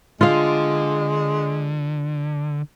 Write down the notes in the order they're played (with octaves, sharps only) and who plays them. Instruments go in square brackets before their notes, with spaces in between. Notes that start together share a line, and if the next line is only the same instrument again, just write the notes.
[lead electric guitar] D3 [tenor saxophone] G#3 [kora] F4 F5